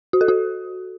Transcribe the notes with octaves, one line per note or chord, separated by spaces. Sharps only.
F#4
A4
F#4